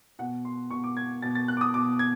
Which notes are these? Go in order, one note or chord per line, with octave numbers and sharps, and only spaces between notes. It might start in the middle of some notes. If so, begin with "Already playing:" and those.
B2 F#5
C6
B2 C#6
D6
G#6
B2 A6
A6
F#6
D6
D#6
B2 D6
G#6